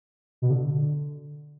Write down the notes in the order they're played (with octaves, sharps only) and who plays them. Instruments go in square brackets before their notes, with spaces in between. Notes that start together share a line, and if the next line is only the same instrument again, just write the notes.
[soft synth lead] B2
D3